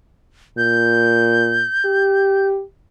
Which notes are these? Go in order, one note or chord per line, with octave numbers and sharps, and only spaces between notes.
A#2 G6
G4